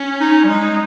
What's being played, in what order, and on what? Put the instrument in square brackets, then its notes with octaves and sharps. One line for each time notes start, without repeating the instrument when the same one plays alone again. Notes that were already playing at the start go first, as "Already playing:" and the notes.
Already playing: [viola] C#4
[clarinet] D#4
G3
[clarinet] G#3 [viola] D#4